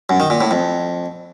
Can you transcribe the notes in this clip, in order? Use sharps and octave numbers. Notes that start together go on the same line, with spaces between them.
F#2
D#3
A#2
A2
F2